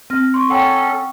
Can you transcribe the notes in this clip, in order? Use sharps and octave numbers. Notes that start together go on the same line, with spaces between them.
C4 F6 A#6
C6 C#6
C#4 A4 F#5 G5 C#6